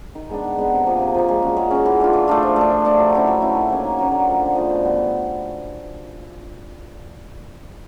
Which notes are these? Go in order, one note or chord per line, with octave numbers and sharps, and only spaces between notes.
D#3
G#3 B3 D4
D#3
G#3 B3 D4
C3
F3 A#3
C3
F3 A#3
G#3
C#4 F#4
G#3
C#4 F#4
E3
A3 D4 F4
E3
A3 D4 F4
F3
A3 D4
F3
A3 D4
F#3
A3 C#4 E4
F#3
A3 C#4 E4
D#3
F#3 A#3 C#4
D#3
F#3 A#3 C#4
D3
F3 A3
D3
F3 A3
B2
G3 B3